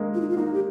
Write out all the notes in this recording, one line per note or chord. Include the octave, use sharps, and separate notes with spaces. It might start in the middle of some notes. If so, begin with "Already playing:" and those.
Already playing: G#3 A#3
F4
D#4
F4
A#3 D#4
G4